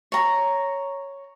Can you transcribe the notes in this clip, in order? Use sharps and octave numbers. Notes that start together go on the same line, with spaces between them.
C#5 A#5